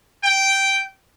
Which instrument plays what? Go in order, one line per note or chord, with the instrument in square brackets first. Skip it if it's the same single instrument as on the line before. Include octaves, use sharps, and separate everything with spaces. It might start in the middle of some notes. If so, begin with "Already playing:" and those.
[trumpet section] G5